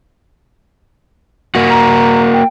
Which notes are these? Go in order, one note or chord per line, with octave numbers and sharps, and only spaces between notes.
A#3 F#4
A#5
G5